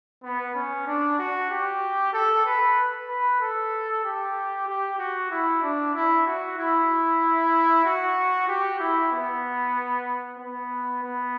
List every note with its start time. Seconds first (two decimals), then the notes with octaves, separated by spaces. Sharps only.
0.23 B3
0.55 C#4
0.87 D4
1.19 F#4
1.50 G4
2.13 A4
2.46 B4
3.08 B4
3.41 A4
4.05 G4
4.67 G4
4.99 F#4
5.31 E4
5.62 D4
5.94 E4
6.26 F#4
6.57 E4
7.85 F#4
8.48 G4
8.80 E4
9.12 B3
10.38 B3
11.02 B3